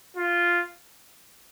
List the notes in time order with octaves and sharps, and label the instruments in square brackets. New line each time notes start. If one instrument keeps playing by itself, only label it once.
[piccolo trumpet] F4